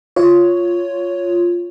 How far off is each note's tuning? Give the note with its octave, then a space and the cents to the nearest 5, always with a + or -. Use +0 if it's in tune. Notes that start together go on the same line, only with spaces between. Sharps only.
F4 +0 C#5 +5